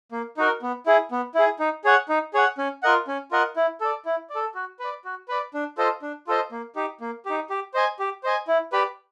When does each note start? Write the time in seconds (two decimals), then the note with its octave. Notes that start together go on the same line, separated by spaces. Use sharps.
0.12 A#3
0.37 D#4 F#4 A#4
0.62 B3
0.86 E4 G#4
1.11 B3
1.35 E4 G#4
1.59 D#4
1.84 G#4 C#5 F#5
2.09 D#4
2.34 G#4 C#5 F#5
2.58 C#4
2.83 F4 A#4 D#5 F#5
3.08 C#4
3.31 F4 A#4 D#5 F#5
3.56 E4
3.81 A4 D5
4.05 E4
4.30 D5
4.35 A4
4.55 F#4
4.79 B4 D5
5.05 F#4
5.28 B4 D5
5.54 D4
5.78 F4 A4 C5 D#5
6.02 D4
6.27 F4 A4 C5 D#5
6.52 A#3
6.76 D#4 G4
7.01 A#3
7.26 D#4 G4
7.50 G4
7.74 C5 D#5 G#5
7.99 G4
8.23 C5 D#5 G#5
8.48 E4
8.72 G4 B4 D5